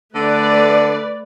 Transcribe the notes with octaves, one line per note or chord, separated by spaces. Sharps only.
D3 A3 B4 D5